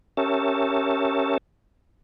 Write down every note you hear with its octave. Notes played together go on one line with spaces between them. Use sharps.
C#4 G4 A#4 C#5 E5 A5